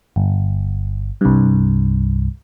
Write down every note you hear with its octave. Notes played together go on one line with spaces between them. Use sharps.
G1
C2 G2